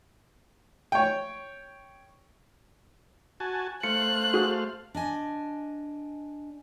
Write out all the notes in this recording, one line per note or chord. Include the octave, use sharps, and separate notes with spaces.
C#5 G5
F#4 G#5 A5
A3 C5 F5 F#6 C#7
F#4 G#4
D4 D#5 G#5